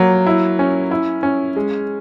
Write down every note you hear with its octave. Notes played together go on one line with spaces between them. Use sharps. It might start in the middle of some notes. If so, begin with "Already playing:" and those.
Already playing: F#3 A#3
E4
C#4
E4
C#4
G#3